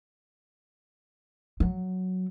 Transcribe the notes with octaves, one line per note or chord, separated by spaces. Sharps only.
F#3